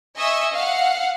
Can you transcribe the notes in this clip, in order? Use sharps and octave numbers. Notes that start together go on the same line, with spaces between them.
D#5 E5 G#5 C#6 E6
F5 F#5